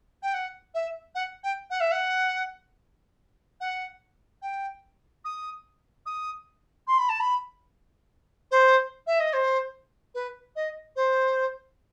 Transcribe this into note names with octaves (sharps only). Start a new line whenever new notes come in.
G5
F#5
E5
F#5
G5
F#5
E5
F#5
F#5
G5
D#6
D#6
C6
B5
A5
B5
C5
E5
D#5
C5
B4
D#5
C5